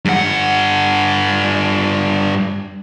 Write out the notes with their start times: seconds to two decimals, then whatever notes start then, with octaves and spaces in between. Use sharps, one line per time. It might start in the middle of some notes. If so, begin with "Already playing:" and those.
0.05 G2 F#5